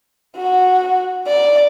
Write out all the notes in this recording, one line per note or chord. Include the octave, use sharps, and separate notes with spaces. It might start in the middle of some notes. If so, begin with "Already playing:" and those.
F#4
D5